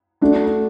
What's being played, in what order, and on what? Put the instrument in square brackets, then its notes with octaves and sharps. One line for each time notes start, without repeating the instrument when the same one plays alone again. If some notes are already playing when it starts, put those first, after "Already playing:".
[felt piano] A3 D4 F#4 A4